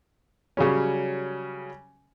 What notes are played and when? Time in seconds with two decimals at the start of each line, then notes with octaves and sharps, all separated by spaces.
0.57 C#3 F#3 G3 C#4